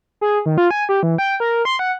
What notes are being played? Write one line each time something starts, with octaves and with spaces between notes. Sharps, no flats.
G#4
D#3
F4
G#5
G4
E3
G5
A#4
C6
F#5